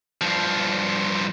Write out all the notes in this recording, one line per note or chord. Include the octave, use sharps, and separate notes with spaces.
G2 F3